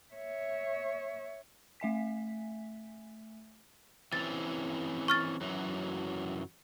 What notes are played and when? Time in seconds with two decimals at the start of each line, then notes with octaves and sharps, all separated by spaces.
0.14 C#5 E5
1.80 A3 E5 G#5 B6
4.13 E3 C4 C#4 A6
5.08 C#6 F6 A6
5.41 F#2 E3 F#3